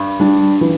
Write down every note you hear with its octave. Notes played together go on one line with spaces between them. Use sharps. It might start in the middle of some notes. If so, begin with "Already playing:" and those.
Already playing: G2
G3 D4
E3